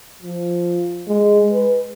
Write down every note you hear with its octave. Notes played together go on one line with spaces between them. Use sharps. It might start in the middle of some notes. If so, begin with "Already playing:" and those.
F3
G#3
B4